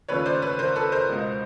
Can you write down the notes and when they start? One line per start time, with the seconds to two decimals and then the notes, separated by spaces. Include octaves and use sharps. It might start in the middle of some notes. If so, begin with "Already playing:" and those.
0.08 D#2 C#3 F3 A3 B4 C#5
0.26 C5 D5
0.42 B4 C#5
0.59 A#4 C5
0.76 A4 B4
0.92 A#4 C5
1.09 C#2 B2 G#3